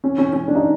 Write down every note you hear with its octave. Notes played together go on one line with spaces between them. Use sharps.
C#4
C#4
C#4
D4
D#4